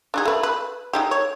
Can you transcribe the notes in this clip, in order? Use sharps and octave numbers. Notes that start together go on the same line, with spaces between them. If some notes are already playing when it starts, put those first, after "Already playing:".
D4 D#4 G#4
A3 B4
B4
G#3 D#4 G4
C#5